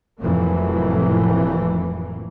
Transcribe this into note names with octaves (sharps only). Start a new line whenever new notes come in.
F1 F2 A2 E3 F#3 A#3